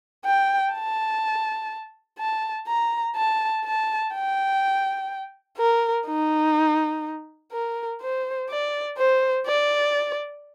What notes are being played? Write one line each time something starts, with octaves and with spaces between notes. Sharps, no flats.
G5
A5
A5
A#5
A5
A5
G5
A#4
D#4
A#4
C5
D5
C5
D5